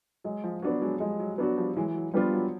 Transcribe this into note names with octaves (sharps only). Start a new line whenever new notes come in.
F#3 G#3
F3
F#3 B3 D4 F#4
F#3 G#3
F3 G3 G#3
F#3
F#3 B3 D4 F#4
F3 G3
E3 F#3 G#3
F#3
F3 G3 B3 D4 F4
F#3